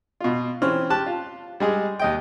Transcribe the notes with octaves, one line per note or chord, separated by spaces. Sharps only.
B2 F4
E3 C4 C#4 F6
G4 A5 F#6
F4
G3 G#3 G#4
D#2 D#5 G5